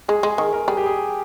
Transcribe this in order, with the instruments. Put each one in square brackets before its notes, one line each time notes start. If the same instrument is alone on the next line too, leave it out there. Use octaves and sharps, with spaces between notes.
[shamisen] G#3 [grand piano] G#4
[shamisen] G#3 [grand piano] G#4
[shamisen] D#3 [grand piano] A#4
[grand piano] A#4
[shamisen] G3 [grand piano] G#4
[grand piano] G4
G#4